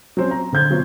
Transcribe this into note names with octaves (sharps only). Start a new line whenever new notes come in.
F#3 C4 C#4
A#5
D3 C5 G6 G#6
B2 F#3 C4 F4